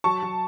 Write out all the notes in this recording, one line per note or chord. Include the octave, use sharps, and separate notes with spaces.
F#3 A5 C#6
F#3